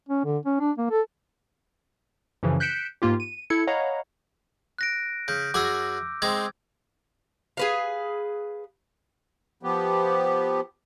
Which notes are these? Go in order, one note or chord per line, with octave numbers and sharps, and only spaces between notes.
C#4
D3
C#4
D4
A#3
A4
F#2 C#3 E3 F3
F#6 G6 B6 C#7 D7 E7
G#2 A#3 F4 G4
D#7
E4 A4 G#6 C#7
C#5 D#5 F5 F#5 A#5 B5
F#6 A#6 D7
C#3 G6
F#2 F#4 G#4 D6 E6
G#3 C4 D#4 G#6
G#4 B4 F5
F3 B3 G4